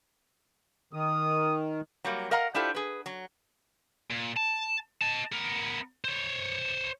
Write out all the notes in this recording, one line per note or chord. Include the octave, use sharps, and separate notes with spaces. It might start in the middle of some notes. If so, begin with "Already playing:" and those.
D#3 D#6
F#3 G3 A#3
A#4 D#5 F5 F#5 A#5
D4 E4 F4 G4 A4 C5
G#4 B4
F#3
A#2
A5
D#5 A5
B3 A#4
C5 C#5